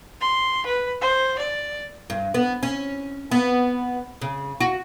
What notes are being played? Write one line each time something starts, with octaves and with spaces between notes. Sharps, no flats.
C6
B4
C5
D5
G2
B3
C#4
B3
C#3
F#4